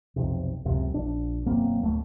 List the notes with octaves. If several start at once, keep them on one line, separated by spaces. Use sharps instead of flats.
B1 F2 C3
C#2 F#2 C3
A#1 D4
E1 F#2 A#3 C4
D1 A3